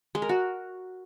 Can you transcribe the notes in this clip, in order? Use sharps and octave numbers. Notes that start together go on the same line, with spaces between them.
G#3
A#4
F#4